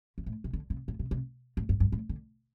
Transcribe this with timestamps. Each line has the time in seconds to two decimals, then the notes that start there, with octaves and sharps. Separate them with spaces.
0.18 E3
0.26 A2
0.44 C3
0.53 D3
0.70 C3
0.88 A2
0.99 C3
1.11 C3
1.57 A2
1.69 G2
1.80 G2
1.92 A2
2.09 D3